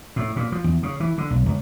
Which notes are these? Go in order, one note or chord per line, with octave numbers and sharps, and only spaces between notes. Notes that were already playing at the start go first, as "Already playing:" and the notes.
A2
A#2
F3
E2
C#3
E3
D3
B1
C#2